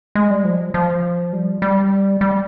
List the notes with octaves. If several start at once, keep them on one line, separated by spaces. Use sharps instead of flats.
G#3
G3
F3
F3
G3
G3
G3